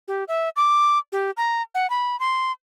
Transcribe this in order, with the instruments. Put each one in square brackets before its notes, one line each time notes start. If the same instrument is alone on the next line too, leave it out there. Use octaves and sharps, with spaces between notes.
[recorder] G4
E5
D6
G4
A#5
F#5
B5
C6